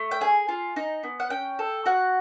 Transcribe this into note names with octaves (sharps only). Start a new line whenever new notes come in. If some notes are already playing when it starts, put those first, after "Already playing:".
Already playing: A3
G5
G#4 G#5
F4
D#4
B3
F#5
C#4 G5
A4
F#4 F#5